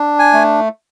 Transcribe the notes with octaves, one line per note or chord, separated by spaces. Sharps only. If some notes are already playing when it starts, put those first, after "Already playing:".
Already playing: D4
G#5
A3